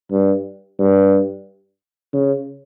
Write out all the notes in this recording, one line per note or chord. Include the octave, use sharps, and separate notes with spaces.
G2
G2
C#3